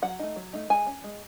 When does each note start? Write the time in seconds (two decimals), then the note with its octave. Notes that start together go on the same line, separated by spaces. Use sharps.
0.02 F#3 F#5
0.19 A3 D#4
0.36 F#3
0.53 A3 D#4
0.70 G#3 G#5
0.87 C#4
1.04 G#3